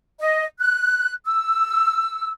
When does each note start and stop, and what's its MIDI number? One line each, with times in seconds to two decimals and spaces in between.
0.20 0.44 75
0.59 1.13 90
1.25 2.30 88